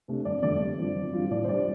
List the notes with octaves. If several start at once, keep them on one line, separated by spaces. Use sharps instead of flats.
C3 A3 D4
G1 D5
F2 D3 A3 D5
G2
F3 C4
G1
G2 F3 C4 F4
A2 D5
C5
G3 D4 D5